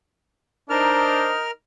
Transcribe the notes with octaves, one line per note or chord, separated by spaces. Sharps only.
D4 D#4 A#4 C5 F6